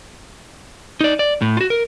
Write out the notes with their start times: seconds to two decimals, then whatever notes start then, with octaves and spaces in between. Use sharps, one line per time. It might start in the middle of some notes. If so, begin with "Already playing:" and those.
1.01 D#4 D5
1.19 D5
1.42 A2
1.57 F4 F#4
1.70 A#4